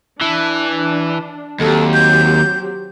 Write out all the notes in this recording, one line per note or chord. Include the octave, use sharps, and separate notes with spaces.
E3 D4
D#2 F#3 C4 G4 A4
G6